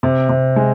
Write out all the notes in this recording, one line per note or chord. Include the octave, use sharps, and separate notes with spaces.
C3
C3
G#3